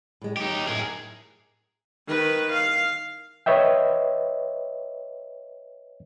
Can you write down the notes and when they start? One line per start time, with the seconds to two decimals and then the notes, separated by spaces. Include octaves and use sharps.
0.21 A2 G#3
0.37 F#3 D#4 G4
0.68 F#2 A2 F#4 G#4 A#4
2.08 D#3 B4
2.52 F5
3.46 B4 C#5 D#5 E5 G5